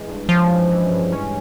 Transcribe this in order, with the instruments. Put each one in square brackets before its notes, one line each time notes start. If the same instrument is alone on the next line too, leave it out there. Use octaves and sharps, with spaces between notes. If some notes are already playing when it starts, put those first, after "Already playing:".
Already playing: [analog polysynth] E3 G#3
G2
[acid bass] F3 [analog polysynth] C#4
[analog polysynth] G#3
E3
G2
C#4